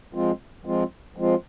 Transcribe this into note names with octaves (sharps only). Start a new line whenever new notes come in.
F3 G#3 C4 F4
F3 G#3 C4 F4
F3 G#3 C4 F4